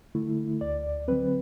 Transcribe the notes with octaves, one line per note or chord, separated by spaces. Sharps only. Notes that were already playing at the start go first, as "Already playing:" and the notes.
D3 A3 E4
D2 D5
D3 F#3 C4 B4